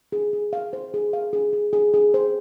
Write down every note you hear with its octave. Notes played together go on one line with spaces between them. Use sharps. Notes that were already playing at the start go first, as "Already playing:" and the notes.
G#4
G#4
F5
C5
G#4
F5
G#4
G#4
G#4
G#4
C5